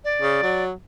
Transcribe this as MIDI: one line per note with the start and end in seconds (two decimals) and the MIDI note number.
0.04 0.63 74
0.22 0.39 49
0.43 0.71 54